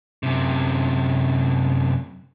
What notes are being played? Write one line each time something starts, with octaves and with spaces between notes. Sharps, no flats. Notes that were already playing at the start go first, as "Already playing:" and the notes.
F#2 C3